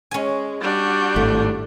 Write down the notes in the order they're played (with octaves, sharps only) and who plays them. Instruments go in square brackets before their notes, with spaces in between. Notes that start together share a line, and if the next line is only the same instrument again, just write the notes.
[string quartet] G#3 [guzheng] C#4 G#5
[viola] G3 D4 [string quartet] F#4 G6
[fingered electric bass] G#1 A2 [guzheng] A3